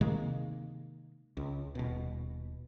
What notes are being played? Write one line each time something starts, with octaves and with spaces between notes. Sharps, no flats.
C3 D#3 G#3 A#3
C#2
D#1 B2